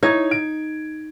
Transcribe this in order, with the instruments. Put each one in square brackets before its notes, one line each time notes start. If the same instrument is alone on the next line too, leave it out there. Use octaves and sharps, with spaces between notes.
[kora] D#4 [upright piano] E4 C#5 G#6
[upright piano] D7